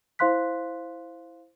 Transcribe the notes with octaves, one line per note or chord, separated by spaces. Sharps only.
E4 C5 F5 C6 F#6 B6